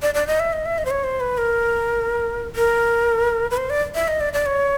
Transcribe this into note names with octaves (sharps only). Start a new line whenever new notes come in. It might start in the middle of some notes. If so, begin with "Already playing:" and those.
D5
D5
D#5
E5
D#5
E5
D#5
C5
C#5
C5
B4
A#4
A#4
B4
C5
D5
E5
D#5
D5
D5
C#5